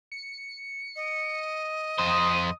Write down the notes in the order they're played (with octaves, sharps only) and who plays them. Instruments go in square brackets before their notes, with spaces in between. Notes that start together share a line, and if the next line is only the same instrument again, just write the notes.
[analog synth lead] C#7
[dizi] D#5
[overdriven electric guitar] F2 C5 [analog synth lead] D#6